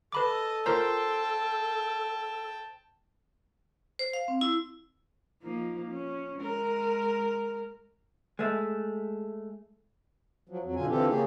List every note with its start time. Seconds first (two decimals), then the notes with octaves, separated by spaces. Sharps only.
0.12 A4 B4 D#5 A5 B5 D6
0.66 F4 A#4 C5 G5 A5 A#5
3.99 C5
4.13 F5
4.28 C4
4.41 E4
5.42 F3 A#3 D#4
5.88 C#4
6.38 G#3 A#4
8.39 G#3 A3
10.49 F3 F#3
10.63 F2 F#3
10.76 B2 D3 F4 G#5
10.89 D3 E3 C4 F4 G4 A4
11.07 C#3 A#3 G4 G#4